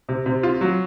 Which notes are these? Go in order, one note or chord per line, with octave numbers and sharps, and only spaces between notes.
C3
C3
F4
F#3